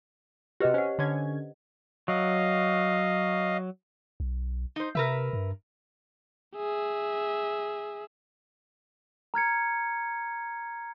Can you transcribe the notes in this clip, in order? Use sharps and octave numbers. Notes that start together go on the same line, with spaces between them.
C3 F#4 G4 B4 D#5
C#4 C5 F#5
D3 C#4 G#6
F#3 D#5 F5
B1
D#4 C5
C3 A#4 B4 E5
G2
G#4 E5
A#5 F6 G#6 C#7